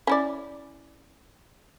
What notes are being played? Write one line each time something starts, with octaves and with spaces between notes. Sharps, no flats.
C#4 E4 D5